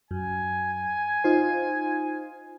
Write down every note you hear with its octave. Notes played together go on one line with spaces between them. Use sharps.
F#2 G#5
D#4 F4 C5